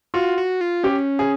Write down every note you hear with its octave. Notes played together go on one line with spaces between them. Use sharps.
F4 F#4
F#4
F4
C#4 G4
G#4